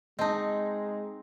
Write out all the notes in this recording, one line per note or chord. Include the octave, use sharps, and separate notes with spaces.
G#3 C4 D#4 D#5 A5